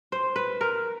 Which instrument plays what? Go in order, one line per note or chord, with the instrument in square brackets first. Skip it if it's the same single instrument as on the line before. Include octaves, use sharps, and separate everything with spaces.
[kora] C5
B4
A#4